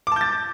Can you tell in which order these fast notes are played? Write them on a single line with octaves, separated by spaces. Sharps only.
D6 A5 G6 A6